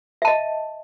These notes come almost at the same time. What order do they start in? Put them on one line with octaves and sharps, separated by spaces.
E5 A5 D#5